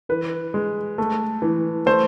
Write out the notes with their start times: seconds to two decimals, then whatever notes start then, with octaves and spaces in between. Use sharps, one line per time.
0.09 E3 B4
0.54 G#3
0.98 A3
1.42 E3
1.86 A3 C5